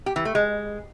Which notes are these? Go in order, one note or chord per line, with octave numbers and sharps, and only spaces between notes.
G4
E3
A3
G#3